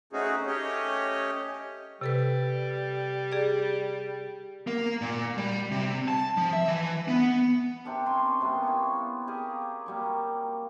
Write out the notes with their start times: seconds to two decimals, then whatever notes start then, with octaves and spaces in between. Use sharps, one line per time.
0.13 A3 C4 C#4 D#4 F#4 G#4
0.47 A3 C#4 G4 C#5 D#5
2.01 C3 G3 A4 B4
3.32 G#4 D5
4.67 A#3
5.02 A#2
5.38 G3
5.72 C3
6.08 A5
6.37 F3
6.53 E5
6.68 E3
7.08 B3
7.85 C3 C4 D4 A#4
8.06 C#4 G#5 C6
8.41 C3 G3 A#3 B3
8.63 B3 E4 F4 C#5
9.27 G4 G#4 A#4 F5
9.86 F#3 G3 A#3